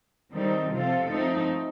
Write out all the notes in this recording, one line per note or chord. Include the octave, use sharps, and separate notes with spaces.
D#3 G3 C4 D#4 A4
C3 F3 C4 F4 A4
F3 A3 C4 D#4